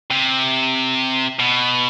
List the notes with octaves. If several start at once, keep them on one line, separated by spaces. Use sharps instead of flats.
C3
B2